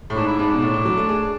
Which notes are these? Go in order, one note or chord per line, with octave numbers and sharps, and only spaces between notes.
A2
G#2 D4
E4
G#2 D4
B2 D4
A2
A2
F#3
A3
G#4